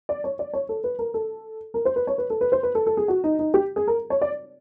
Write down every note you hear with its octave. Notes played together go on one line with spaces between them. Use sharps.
D5
C#5
D5
C#5
A4
B4
A#4
A4
A#4
C5
B4
C#5
B4
A4
B4
C5
B4
A4
A4
G#4
F#4
D#4
D#4
G4
G#4
A#4
C#5
D5